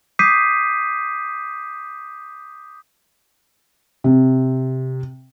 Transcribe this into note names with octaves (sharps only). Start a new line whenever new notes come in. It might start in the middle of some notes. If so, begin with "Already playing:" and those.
D6 D#6 G6 B6 C7 D#7
C3